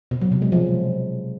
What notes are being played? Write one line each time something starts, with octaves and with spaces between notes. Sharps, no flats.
B2
F#3
C3
G#3
F3